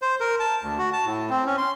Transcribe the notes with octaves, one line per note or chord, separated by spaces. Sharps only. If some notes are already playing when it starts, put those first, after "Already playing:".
C5
A#4
A5
D2
F#4
A5
A2
C4
C#4
C6